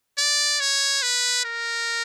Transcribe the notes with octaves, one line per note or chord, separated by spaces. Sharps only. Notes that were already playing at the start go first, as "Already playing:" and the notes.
D5
C#5
B4
A#4